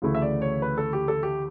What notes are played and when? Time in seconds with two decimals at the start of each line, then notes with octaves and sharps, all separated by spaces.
0.02 D2 C#3 E3 A3 E4
0.15 E5
0.22 D5
0.42 C#5
0.62 B4
0.78 A4
0.93 G4
1.08 A4
1.23 G4